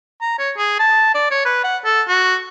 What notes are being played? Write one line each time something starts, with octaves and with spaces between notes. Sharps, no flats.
A#5
C#5
G#4
A5
D5
C#5
B4
F#5
A4
F#4